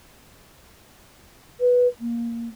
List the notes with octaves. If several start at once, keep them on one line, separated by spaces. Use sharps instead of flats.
B4
A#3